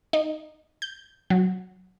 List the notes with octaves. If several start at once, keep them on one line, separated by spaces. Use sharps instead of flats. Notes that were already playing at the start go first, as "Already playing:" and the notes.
D#4
G6
F#3